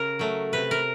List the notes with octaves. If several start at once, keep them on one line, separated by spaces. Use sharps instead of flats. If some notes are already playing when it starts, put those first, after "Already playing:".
Already playing: C#3 A#4
F#3 A3
C3 B4
A#4